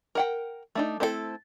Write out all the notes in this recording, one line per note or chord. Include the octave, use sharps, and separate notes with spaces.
A#4 F#5 G5
A3 D4 D#4
A3 C4 E4 F4 A4